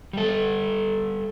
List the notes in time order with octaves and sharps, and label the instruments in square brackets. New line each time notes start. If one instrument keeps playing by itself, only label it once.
[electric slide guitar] G3 A4